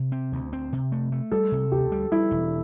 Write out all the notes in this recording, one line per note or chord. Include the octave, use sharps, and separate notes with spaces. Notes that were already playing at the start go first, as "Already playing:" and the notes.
Already playing: C3
C4
D2
C4
C3
A3
A3
G3 A4
C3
D2 G4
G3
G3 E4
E1